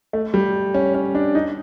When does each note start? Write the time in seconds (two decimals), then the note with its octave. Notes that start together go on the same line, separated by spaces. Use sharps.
0.13 A3
0.34 G3
0.74 C#4
0.94 C#4
1.15 D4
1.35 D#4